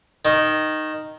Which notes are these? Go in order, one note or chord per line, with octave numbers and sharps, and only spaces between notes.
D#3